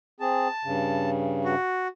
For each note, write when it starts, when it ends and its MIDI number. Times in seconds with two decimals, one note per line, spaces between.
0.20 0.48 60
0.20 0.48 68
0.20 1.10 81
0.64 1.55 43
0.64 1.55 49
1.45 1.87 66